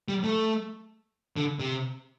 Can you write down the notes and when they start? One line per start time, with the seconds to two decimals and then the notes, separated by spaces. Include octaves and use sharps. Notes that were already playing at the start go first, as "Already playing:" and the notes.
0.08 G3
0.24 A3
1.36 D3
1.60 C3